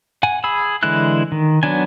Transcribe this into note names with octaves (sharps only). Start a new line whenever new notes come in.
F#5 G#5
G#4 B5 E6
D3 E3 G#3 E4 F#6
D#3
F#3 B3 D4 G#5